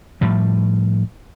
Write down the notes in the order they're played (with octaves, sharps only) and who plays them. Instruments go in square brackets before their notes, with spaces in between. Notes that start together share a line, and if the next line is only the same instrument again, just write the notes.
[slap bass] A2 F3 G3